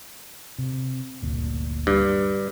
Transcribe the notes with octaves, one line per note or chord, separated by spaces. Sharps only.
C3
G1 D2 A#2
G2